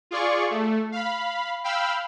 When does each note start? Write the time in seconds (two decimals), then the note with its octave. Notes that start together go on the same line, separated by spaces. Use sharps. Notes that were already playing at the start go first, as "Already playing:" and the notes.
0.11 F4 G#4 D5 C#6
0.50 A3
0.92 F5 B5
1.64 F5 G5 B5 E6 F6